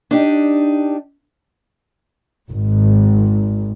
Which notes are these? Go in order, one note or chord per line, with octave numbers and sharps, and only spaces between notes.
D4 D#4 G4
G#1